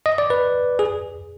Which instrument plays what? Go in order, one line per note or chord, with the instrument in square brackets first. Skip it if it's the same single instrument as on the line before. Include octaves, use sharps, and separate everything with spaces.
[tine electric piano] D#5
D5
B4
G#4